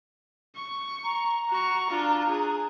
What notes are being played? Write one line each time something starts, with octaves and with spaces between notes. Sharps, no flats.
C#6
A#5
F#4 C#6
D4 F4
G#4